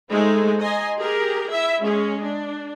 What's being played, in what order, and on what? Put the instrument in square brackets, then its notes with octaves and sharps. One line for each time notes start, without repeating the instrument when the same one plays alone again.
[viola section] G#3 A3 D#4 C5
D#5 G#5 A#5 C6
G4 G#4 A#4
E4 E5
G#3 C#4 G#4
D4